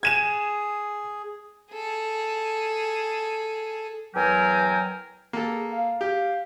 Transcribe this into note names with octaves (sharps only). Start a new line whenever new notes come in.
G#4 G#6 D#7 E7
G#4 A4
E2 F#3 A#4 G5 G#5
A#3 G4 A4
G#4
F5
G4